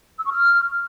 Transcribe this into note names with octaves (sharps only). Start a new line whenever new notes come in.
E6
C#6
F6